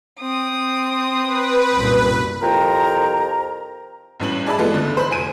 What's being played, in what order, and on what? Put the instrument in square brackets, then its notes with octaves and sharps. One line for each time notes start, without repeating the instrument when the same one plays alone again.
[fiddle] C4 D#6
[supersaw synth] B4
[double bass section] C2 F#2 A#2
[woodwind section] C2 F2 F3 A#4 G5 A#5
[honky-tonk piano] A1 G2 C#4 F#7
D#4 G#4 D5 E5 A5 B5
E3 G#3 A3 B3 F4 A4
C#2 D3 A3
C5 B5
F1 G#5 D#7